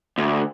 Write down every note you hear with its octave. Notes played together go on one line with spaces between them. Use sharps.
D2